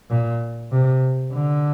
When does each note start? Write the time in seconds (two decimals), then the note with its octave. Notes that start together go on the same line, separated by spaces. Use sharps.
0.10 A#2
0.72 C3
1.33 D3